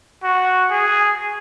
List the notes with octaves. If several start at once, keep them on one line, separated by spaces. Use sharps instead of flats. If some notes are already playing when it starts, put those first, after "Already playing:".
F#4
G#4